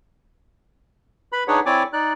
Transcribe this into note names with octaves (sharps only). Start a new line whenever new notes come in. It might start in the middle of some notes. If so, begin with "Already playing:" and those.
B4 B5
D4 D#4 G#4 B4 C#5 F#5
C4 E4 C#5 D5 G#5 D6
D#4 D5 F#6